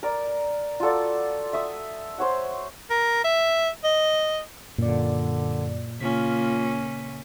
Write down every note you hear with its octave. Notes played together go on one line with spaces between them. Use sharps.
A#4 D5
F4 F#4 A4 D5
E5 D#6
C5 C#5 F#5
A#4
E5
D#5
F#2 A#2 D3 D5
C#3 A#3 C#4 F4 B6